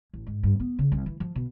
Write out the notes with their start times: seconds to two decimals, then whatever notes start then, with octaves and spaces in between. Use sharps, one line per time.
0.13 A1
0.27 G#2
0.43 G2
0.60 B3
0.79 C#3
0.92 C2
1.06 E3
1.20 F3
1.35 B2